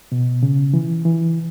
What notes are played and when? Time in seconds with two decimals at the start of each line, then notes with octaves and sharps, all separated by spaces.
0.12 B2
0.43 C#3
0.74 E3
1.05 E3